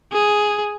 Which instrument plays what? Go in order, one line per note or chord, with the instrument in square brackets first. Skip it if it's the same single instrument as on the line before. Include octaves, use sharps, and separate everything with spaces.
[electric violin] G#4